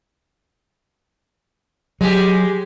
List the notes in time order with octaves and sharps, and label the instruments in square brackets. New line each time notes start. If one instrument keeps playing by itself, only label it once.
[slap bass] F#3 [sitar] G#3 G4